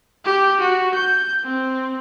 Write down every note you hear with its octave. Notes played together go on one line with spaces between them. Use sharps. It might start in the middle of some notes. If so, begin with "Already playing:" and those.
G4
F#4
G6
C4